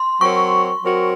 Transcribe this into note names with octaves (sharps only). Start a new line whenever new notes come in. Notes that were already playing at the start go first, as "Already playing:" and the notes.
Already playing: C6
F#3 C4 F#4 A#4 C#5 C#6
F#3 C4 F#4 A#4 C#5